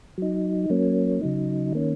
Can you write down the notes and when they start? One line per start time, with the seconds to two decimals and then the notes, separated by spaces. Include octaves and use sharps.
0.18 F#3 D#4
0.70 F#3 A#3 C#4
1.21 C#3 F#3 D#4
1.72 D#3 A#3 C#4